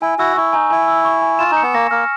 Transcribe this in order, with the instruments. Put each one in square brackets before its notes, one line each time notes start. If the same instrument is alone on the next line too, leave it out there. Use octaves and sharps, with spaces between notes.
[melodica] E4 [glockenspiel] G#5
[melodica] E4 F#4 [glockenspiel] E6
[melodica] E4 [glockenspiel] C#6
[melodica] D#4 [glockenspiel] G#5
[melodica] E4 [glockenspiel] G#5
[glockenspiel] E6
C#6
G#5
[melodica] F4 [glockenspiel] E7
[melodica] D#4
[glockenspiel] C#7
[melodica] B3
[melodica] A#3 [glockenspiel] A#6
[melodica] A#3 [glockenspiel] F6